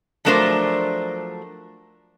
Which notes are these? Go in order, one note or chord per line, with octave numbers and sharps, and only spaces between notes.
F3 F#3 A3 D4 A#4 C5